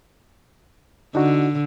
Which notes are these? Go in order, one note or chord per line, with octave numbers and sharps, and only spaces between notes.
D3 D4 D#4 F#4